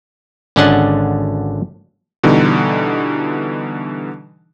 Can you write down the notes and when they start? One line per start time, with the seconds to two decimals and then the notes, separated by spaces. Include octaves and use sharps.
0.56 G#1 D3 C#4 D4 D#5 F#5
2.23 B2 D3 E3 G3 D#4